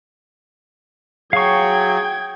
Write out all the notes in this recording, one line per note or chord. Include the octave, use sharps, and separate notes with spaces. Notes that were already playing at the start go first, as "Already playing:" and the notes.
F#3 G#4 F5 G5 C#6 G#6